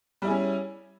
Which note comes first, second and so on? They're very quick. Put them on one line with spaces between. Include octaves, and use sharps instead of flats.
G3 E4 G#4 C#4